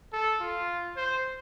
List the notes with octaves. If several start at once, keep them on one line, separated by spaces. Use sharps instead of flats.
A4
F4
C5